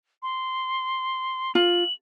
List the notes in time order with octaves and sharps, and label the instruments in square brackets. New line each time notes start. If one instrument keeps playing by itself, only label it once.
[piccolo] C6
[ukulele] F4 [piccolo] F#7